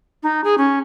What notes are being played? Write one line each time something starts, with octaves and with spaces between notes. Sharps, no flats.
D#4
G#4
C#4